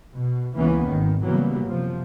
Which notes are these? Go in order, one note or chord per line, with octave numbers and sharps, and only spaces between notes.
B2
F#1 C#2 E3 A#3 B3 C#4
G#1 E2 D#3
C#3 E3 F#3 G3 A#3 B3
F#2 C3 F3